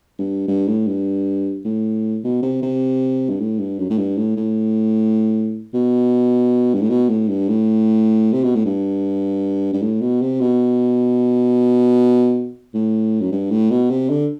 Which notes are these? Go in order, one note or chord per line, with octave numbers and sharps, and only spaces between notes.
G2
G2
A2
G2
A2
B2
C3
C3
G2
A2
G2
F#2
A2
G2
A2
A2
B2
G2
A2
B2
A2
G2
A2
C3
B2
A2
G2
G2
A2
B2
C3
B2
A2
F#2
G2
A2
B2
C3
D3